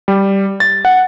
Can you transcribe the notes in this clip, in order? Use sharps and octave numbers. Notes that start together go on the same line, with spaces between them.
G3
A6
F#5